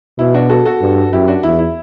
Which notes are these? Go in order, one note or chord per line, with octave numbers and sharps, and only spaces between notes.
B2 E4
D4 F#4
F#4 A4
F#4 A4
G2
F#2 E4 G4
D4 F#4
E2 E4
E4